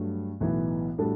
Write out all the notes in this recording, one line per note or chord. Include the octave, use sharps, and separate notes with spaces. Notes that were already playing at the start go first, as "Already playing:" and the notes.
Already playing: G2 F#3 A3
B1 A2 E3 B3 E4
A2 G3 D4 F#4 A4